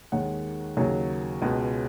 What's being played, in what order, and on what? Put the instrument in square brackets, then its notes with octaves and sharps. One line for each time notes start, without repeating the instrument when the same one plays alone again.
[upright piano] D#2 D#3 G#3 C#5 F#5
D#2 C#3 F#3 G#4 C#5
C#2 B2 G#3